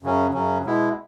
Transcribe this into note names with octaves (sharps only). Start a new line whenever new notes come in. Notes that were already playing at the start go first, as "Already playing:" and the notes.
F#2 C#3 F#3 C#4
F#2 C#3 F#3 C#4
B2 G#3 B3 E4